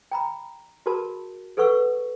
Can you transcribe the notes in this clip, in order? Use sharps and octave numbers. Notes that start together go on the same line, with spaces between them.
G5 A#5 B5
F#4 G#4 A#4 A5 B5
G#4 A4 B4 F#5 C#6 E6